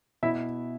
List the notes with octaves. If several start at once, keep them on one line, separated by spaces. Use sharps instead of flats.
B2 B3 E4 E5